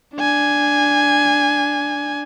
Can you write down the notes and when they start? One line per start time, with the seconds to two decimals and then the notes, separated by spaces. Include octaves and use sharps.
0.15 D4 G#5